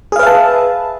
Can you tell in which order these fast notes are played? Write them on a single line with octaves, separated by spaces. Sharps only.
G#4 F5 B4 E5 A5